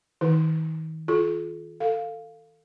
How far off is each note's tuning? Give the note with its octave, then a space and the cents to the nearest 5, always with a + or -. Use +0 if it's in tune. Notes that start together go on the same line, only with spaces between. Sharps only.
D#3 +35 D#4 +45 B4 +0
F4 +0 A4 -45
A4 +25 F5 +0